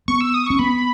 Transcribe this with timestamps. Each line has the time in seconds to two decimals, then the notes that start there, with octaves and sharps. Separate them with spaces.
0.08 B3 C#6
0.21 E6
0.34 D#6
0.46 C#4 C#6
0.59 B3 B5